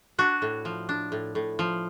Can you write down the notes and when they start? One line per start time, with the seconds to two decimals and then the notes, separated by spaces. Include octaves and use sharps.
0.19 D4 F#4
0.42 A2
0.65 F3
0.89 D4
1.12 A2
1.35 A2
1.59 F3